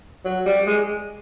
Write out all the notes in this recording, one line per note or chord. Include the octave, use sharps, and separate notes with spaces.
F#3
G3
G#3